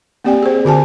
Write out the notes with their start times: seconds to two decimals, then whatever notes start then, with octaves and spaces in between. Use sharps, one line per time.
0.24 A#3 C4 G4 D5 G5 G#5
0.42 G#4 C5
0.65 D3 F#4 G#5 A5